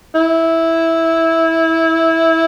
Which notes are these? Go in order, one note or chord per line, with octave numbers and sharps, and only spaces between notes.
E4